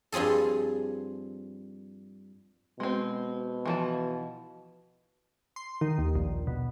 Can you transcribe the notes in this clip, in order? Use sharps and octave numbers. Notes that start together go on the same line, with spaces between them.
G2 F3 C4 G#4 A4
B2 G#3 C4
E3 F3 A5
C6
D#3
D#2
A#1
B2